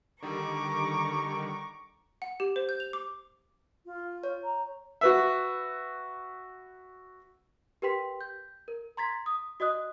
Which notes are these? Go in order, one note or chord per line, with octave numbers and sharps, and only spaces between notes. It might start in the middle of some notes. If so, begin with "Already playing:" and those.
D3 D#3 G3 A#5 C#6 D6
F#5
G4
C5
G6
F7
D6
F4
C#5
A#5
F#4 B4 E5
G4 A#4 B4 G5 C6 B6
G6
A#4
A#5 C6 G#6 A6 B6
D#6
F#4 D5 D#5 D#6 F#6